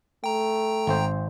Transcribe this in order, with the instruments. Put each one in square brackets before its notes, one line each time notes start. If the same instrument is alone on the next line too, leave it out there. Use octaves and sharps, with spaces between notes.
[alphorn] A3 [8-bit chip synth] G5 A#5
[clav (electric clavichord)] G#1 C4 C5